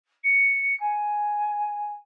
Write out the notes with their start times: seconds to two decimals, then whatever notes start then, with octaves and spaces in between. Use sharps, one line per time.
0.23 C#7
0.79 G#5